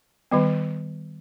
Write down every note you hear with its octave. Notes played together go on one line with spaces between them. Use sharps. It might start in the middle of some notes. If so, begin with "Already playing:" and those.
D#3 G3 B3